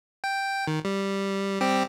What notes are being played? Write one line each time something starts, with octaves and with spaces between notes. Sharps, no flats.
G5
D#3
G3
G3 C4 G4